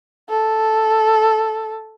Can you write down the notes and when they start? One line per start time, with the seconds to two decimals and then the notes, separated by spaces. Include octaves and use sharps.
0.29 A4